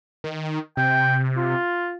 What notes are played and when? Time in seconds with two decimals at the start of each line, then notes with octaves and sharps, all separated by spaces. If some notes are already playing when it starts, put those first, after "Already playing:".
0.24 D#3
0.77 C3 G5
1.36 F4